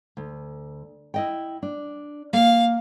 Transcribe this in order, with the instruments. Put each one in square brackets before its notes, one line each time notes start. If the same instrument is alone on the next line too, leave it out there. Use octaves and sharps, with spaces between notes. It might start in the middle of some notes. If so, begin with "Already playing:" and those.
[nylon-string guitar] D2
E4 D#5 G5
D4
[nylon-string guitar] A#3 A#4 [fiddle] F5